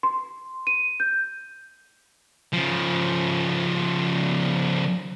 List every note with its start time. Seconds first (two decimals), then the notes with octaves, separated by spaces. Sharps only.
0.03 C6
0.67 D#7
1.00 G6
2.53 C#3 F3